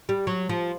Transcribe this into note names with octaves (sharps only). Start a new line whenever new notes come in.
G3
F#3
F3